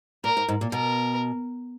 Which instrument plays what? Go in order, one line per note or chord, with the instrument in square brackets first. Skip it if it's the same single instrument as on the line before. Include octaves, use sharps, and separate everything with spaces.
[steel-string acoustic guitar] A#2 [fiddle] A#4
[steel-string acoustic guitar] G#2
G#2
A#2
[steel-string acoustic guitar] B2 [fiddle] A#4